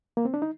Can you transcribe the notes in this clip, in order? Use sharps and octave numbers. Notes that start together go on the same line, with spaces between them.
A#3
C4
D4
D#4